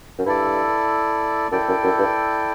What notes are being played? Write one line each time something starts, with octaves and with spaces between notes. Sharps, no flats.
F#2
G2 E4 A4 D5
F#2 E4 A4 D5 G5
F#2
F#2
G2